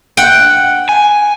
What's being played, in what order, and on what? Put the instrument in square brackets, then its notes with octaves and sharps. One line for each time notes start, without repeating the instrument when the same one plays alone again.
[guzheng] F#5 G5
[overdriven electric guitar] G#5